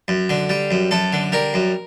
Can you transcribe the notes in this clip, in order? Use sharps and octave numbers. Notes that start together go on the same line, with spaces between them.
F#2
D3
G3
F#2
F#2 A4
D3
G3 A#4
F#2